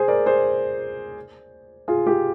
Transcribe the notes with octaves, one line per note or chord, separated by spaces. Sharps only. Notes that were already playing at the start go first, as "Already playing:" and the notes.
Already playing: G#4 C5
A#4 D5
G#4 C5
F4 G#4
G4